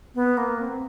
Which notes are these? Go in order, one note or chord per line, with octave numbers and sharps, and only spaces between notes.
B3
A#3
C4